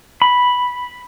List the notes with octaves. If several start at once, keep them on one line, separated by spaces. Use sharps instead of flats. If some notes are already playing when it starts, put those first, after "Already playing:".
B5